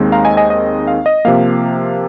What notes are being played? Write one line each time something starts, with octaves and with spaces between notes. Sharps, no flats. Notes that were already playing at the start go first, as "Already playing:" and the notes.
Already playing: D#2 D#3 G#3 C4 D#4
F5 A#5
D#5 G#5
D#5 G#5
D#5
F5
D#5
C3 F3 A#3 F5